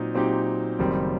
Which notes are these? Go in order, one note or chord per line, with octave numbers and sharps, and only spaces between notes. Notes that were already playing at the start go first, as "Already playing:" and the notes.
Already playing: A#2 F#3 C4 D#4
A#2 F#3 C4 D#4 G4
F#1 F#2 D#3 G3 C4